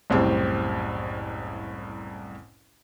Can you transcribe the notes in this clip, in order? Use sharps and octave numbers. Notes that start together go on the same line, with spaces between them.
F#1 C2 A2 C4 G4